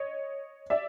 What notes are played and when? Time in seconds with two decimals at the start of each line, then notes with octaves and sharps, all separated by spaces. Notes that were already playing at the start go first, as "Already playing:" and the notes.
Already playing: C#5 D#5
0.70 D5 E5